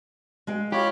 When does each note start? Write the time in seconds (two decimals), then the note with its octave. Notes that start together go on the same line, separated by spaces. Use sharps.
0.47 G#3 F5 G5
0.72 F4 G4 C#5 B5